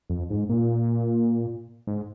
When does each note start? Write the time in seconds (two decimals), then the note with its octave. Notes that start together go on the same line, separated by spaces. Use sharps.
0.10 F2
0.30 G#2
0.49 A#2
1.87 G#2